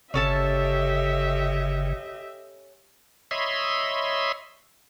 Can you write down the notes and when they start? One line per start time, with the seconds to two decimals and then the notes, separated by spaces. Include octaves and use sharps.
0.14 G1 C#3 C#4 G4 A4 D#5 E5 A5
3.31 C#5 D#5 E5 B5 C6